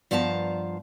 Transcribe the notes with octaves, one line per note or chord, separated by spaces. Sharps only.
G2 F3 B3 F5 A5 A#5